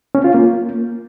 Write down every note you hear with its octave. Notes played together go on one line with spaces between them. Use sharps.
C#4
F4
A#3